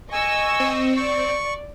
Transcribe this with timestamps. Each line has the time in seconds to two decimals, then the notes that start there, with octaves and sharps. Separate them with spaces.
0.12 D#5 G#5 C#6 E6
0.60 C4
0.97 D5 C#6